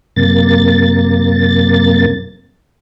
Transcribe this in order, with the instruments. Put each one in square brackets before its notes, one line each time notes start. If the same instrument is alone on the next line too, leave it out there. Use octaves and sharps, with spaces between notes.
[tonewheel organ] F#2 C3 A#3 A6